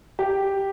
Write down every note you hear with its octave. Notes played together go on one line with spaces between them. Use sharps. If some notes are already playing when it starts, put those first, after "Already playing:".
G4